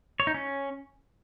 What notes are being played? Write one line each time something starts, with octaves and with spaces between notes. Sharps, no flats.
C#5
D#4
C#4